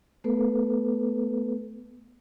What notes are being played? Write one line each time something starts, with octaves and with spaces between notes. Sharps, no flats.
A3 B3 A4 B4